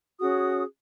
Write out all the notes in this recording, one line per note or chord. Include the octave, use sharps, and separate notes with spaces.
C#4 F#4 G#4 D#6